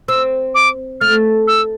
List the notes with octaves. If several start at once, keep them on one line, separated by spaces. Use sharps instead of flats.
C4 E6
D6
A3 F6
E6